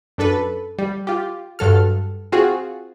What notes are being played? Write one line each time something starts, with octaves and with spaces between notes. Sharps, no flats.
F#2 D4 A4 B4
G3
F4 G4
G2 F#3 A4 F6
C4 F4 F#4 G#4